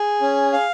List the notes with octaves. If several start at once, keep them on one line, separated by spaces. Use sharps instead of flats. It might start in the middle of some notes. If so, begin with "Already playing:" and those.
Already playing: G#4
C#4
F5